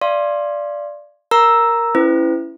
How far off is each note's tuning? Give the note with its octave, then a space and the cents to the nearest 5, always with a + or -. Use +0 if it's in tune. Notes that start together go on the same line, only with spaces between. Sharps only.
D5 +0 F5 -30 C6 +20
A#4 +0 A#5 +0 E6 +0
C#4 +0 E4 +15 B4 +45